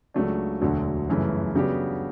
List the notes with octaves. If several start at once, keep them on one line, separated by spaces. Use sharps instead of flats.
C#2 C#3 F#3 A3 D4
E1 D2 D3 F#3
G1 F#2 C#3 E3 A3
C#3 F#3 B3 D4 G4